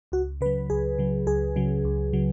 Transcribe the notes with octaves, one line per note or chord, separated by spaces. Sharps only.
C#2 F#4
C#3 F#3 B4
C#2 G#4
C#3 F#3
C#2 G#4
C#3 F#3
C#2
C#3 F#3